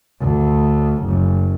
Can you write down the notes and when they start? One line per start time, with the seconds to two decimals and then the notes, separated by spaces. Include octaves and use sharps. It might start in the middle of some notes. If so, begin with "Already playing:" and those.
0.20 D2
1.04 F#1